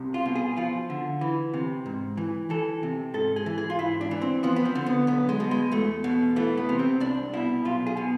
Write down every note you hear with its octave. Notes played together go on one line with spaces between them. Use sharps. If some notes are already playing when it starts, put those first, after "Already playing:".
Already playing: C2 C3
F4
B2
G#4
F3 F4
D3
E3
C3
G#2
E3
E3 A4
C3
G#2 A4
G#4
E3
G#4
F4
G#2 E4
D4
E3
C4
F3 B3
B3
C4
D3
B3
B1 B3
G#3
B2
G#3
E2 A3
B2
E3 A3
B3
C3
C4
C2 D4
B2 E4
B1 F4
G#4
B2